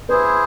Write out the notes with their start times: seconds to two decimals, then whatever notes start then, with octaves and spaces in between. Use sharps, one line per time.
0.09 E4 G#4 B4 C5